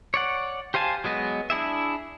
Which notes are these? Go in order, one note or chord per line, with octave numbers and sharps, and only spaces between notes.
C#5 D5 F#5
G4 C5 F5 G#5 A5
F#3 G#3 B3 D#5
D4 E4 G#4 E5